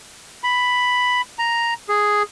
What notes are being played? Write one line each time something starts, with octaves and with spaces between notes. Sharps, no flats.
B5
A#5
G#4